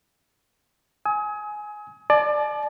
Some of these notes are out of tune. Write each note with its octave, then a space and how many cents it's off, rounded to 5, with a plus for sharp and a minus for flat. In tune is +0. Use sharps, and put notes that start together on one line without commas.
G#5 +15 D#6 +40
D5 +25 A5 -40